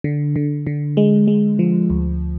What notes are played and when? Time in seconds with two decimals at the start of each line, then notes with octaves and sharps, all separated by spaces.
0.04 D3
0.36 D3
0.67 D3
0.97 G#3
1.28 G#3
1.59 F3
1.90 D2